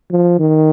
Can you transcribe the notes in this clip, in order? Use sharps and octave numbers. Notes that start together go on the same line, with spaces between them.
F3
D#3